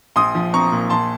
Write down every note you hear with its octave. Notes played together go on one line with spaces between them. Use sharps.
A#1 C6 D#6
F3
C4 A#5 C#6
A#2
A#1 A5 C6